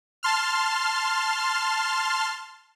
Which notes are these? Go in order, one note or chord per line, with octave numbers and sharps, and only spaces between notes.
A5 C6 F6